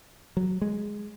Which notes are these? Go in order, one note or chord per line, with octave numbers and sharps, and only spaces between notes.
F#3
G#3